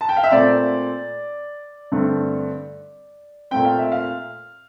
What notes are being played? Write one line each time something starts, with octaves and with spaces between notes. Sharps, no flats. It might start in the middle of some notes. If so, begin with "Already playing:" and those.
A5
G5
F5
E5
A#2 A3 C4 D5
G2 D3 A3 C4
A#2 A3 C4 G5
F5
E5
F5